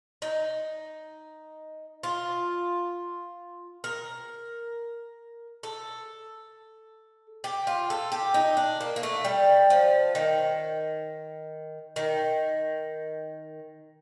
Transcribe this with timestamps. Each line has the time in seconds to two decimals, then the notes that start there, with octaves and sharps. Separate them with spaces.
0.22 D#4
2.03 F4
3.84 A#4
5.63 A4
7.44 G4
7.67 F4
7.90 A4
8.12 G4
8.34 D#4
8.57 D4
8.81 A#3
8.96 A#3
9.03 A3
9.25 G3
9.70 F3
10.15 D#3
11.96 D#3